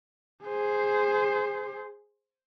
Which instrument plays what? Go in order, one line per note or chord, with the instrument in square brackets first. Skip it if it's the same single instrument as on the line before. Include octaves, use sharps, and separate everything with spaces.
[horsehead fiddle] G#4 C5